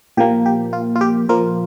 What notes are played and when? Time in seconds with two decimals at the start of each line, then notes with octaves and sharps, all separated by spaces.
0.17 A#2 F3 A#3 G4
0.46 G4
0.73 F4
0.95 F4
1.01 G4
1.29 A#2 F3 A#3 F4 A#4